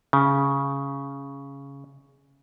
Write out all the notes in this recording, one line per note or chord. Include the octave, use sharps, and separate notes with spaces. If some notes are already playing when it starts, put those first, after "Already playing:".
C#3